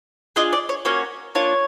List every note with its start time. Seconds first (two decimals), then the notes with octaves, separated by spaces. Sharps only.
0.36 D4 F4 G#4 D#5
0.53 D5
0.69 C#5
0.85 A#3 C#4 F#4 C#5
1.35 A#3 D4 F4 C#5